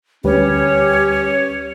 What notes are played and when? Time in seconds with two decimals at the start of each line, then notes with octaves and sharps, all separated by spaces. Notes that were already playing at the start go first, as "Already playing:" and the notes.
0.24 D2 G3 C#4 G4 B4 C#5